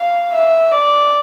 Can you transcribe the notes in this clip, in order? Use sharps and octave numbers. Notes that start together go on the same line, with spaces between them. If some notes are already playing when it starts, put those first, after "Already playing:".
Already playing: F5
E5
D5